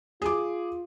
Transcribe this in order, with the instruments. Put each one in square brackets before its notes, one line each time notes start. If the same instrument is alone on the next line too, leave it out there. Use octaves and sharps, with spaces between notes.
[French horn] F4 [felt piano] G#4 D6